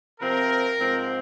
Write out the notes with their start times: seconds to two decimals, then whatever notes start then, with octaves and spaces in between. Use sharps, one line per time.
0.20 C3 F3 C4 A#4
0.78 G#2 F3 C4